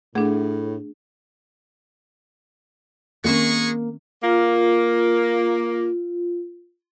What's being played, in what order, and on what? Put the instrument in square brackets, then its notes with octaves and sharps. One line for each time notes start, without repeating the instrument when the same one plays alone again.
[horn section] A2 [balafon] A3 F#5 [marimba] D4 G#4
[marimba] D#3 C4 C#4 [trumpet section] G#3 G#4 C#6 [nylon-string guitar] A#3 A#4
[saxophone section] A#3 [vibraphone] F4